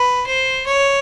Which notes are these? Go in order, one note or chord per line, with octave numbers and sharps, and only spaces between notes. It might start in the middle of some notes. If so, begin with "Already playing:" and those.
Already playing: B4
C5
C#5